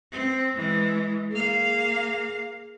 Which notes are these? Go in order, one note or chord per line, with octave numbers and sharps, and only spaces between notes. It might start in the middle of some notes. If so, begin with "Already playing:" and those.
C4
E3 G#3
A#3 G#4 F5